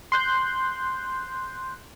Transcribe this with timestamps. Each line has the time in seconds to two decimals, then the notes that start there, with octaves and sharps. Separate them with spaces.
0.12 C6 F#6 G6